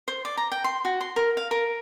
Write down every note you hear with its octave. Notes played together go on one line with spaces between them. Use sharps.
C5
D5
A#5
G5
C6
F#4
C6
A#4
F5
A#4